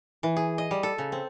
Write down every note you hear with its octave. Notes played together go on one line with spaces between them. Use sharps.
E3
G#4
D#5
G3
A4
C#3
C4